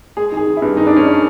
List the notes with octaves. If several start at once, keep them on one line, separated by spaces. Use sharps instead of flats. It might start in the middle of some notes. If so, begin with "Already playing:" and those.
G#3 G#4
D#3
G#4
D#3
E4
G2
D#3 D#4
D4
D#3 C#4
D4